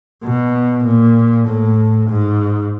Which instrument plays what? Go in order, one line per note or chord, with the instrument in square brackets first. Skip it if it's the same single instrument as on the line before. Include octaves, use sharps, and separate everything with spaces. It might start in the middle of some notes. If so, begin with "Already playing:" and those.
[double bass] B2
A#2
A2
G#2